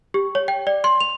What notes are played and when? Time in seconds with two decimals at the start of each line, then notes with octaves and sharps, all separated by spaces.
0.14 G4
0.35 C#5
0.48 G5
0.67 D5
0.84 C6
1.00 F7